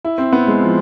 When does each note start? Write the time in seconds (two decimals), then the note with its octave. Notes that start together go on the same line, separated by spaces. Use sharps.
0.04 E4
0.18 C4
0.33 B3
0.47 G#3
0.61 F3